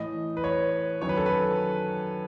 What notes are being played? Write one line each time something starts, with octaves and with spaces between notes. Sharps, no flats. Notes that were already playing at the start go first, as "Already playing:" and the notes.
Already playing: A2 E3 D#5
B4
C#5
F#2 D#3 F#3 C#5
B4
A4
B4